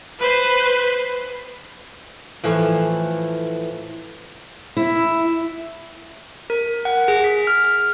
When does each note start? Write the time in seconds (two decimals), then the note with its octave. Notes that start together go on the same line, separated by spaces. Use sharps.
0.19 B4 C5
2.44 A2 E3 F3
4.77 E4
6.50 A#4
6.85 F#5
7.08 G#4
7.24 B6
7.47 F6